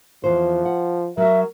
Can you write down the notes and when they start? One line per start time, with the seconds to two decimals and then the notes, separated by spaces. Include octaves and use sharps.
0.24 E2 E3 F3 C5
0.65 F#5
1.17 F#3 F#4 A#4 E5